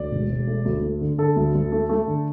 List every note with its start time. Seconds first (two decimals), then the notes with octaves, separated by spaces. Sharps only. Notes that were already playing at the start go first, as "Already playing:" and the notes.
Already playing: D2 D5
0.12 E1
0.29 E1
0.47 A3
0.65 D2
0.82 A3
1.01 D3
1.18 D3 A4
1.36 D2
1.54 D2
1.72 A3
1.89 A3
2.07 D3